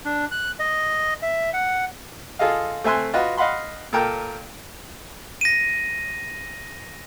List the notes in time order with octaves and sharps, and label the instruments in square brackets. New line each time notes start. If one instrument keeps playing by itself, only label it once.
[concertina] D4
F#6
D#5
E5
F#5
[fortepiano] F4 G#4 A4 D#5 F5
A3 C4 E5 G#5 C6 F#6
F4 F#4 B4 D#5
D#5 F5 F#5 B5 C6
A#2 A4 A#4 G5
[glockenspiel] A#6 D#7